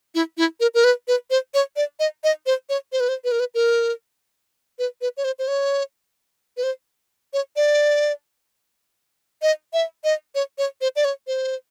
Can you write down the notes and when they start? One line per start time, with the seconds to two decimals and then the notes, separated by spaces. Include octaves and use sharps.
0.15 E4
0.38 E4
0.60 A#4
0.74 A#4
0.84 B4
1.08 B4
1.30 C5
1.54 C#5
1.76 D5
1.99 D#5
2.24 D#5
2.46 C5
2.69 C#5
2.92 C5
3.00 B4
3.09 C5
3.24 B4
3.31 A#4
3.40 B4
3.54 A#4
4.79 B4
5.01 B4
5.17 C#5
5.24 C5
5.39 C5
5.48 C#5
6.57 B4
6.63 C5
7.33 C#5
7.56 D5
9.42 D#5
9.73 E5
10.04 D#5
10.35 C#5
10.58 C#5
10.81 C5
10.96 D5
11.04 C#5
11.27 C5